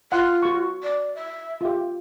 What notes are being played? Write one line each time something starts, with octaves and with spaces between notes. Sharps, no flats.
F4 F#5 C6
F#4 C#6
D5
E5
F4 G4